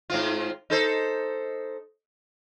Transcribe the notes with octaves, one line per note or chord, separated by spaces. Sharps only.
G#2 C4 F4
D#4 A4 C5